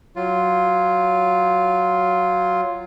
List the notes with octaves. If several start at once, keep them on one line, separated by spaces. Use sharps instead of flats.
F#3 F4